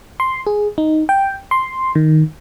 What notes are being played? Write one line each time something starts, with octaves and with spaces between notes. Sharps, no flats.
C6
G#4
D#4
G5
C6
D#3